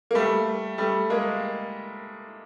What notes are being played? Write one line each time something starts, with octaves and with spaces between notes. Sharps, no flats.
A#3
G3 A3
G3 A3
G#3 A#3